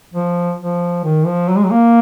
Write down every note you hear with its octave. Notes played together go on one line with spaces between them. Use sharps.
F3
F3
D#3
F3
F#3
G#3
F#3
A#3